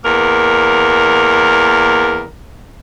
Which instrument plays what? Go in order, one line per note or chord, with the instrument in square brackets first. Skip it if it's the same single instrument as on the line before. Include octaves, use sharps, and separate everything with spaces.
[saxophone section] E2 A#3 A#4